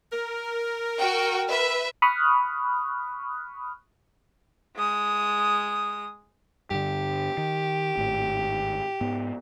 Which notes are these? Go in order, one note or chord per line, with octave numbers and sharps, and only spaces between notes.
A#4
F#4 G5
B4 E5
B5 C#6 D#6 F6 F#6
G#3 D#6
G2 D3 G4
D#3
G#1 A2
G#2 B3